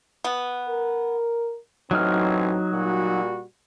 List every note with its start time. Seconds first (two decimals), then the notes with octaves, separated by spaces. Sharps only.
0.24 B3
0.69 A#4
1.91 A1 E3 F#3 C4 D#4 F6
2.72 A#2 G3 F#4